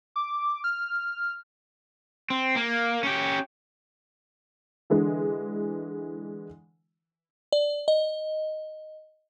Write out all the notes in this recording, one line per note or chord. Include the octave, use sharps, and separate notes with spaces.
D6
F6
C4
A#3
C#4 G4
D3 E3 G#3
D5
D#5